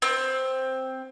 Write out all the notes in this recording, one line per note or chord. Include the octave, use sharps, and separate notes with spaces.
C4